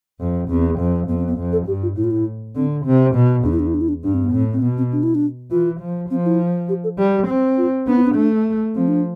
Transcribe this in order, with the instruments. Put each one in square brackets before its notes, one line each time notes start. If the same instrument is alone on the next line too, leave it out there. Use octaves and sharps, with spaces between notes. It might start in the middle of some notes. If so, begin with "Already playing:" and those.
[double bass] F2
[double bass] E2 [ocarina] C4
[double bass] F2
[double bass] F2 [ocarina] B3
[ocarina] C4
B3
[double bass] F2
[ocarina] A4
[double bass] G2 [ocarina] G4
[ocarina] F4
[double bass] A2 [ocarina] E4
[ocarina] F4
E4
[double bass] D3 [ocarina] C4
[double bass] C3 [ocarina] C4
[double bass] B2
[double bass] E2 [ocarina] D4
[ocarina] E4
D4
E4
D4
E4
D4
[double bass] G2 [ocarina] D4
[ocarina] C4
B3
[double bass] A2 [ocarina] C4
[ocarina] C4
[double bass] B2 [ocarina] B3
[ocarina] C4
D4
E4
D4
[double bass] E3 [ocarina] F4
[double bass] F3
[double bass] F3 [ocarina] C4
[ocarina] E4
G4
A4
[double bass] G3 [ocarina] G4
[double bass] C4
[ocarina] F4
[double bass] B3 [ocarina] D4
[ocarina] E4
C4
D4
[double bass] A3
[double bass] F3 [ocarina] C4
[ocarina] D4